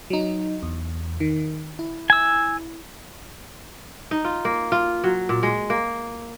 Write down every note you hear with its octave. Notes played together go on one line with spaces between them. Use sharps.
F#3 D#4
E2
D#3
E4
G#5 E6
D#4
F4
A#3
F4
F#3
A#2
G#3
A#3